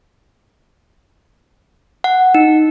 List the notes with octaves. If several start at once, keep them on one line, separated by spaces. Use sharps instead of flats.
F#5
D#4